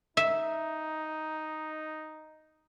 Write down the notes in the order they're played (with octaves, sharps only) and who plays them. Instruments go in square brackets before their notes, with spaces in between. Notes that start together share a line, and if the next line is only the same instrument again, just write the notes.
[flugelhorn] D#4 [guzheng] E5